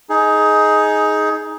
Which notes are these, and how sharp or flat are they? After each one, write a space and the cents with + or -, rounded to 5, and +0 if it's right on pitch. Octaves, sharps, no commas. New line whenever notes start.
D#4 +10 G#4 +15